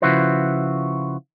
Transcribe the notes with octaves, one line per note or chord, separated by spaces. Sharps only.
C#3 F3 E4 F#4 B4 C5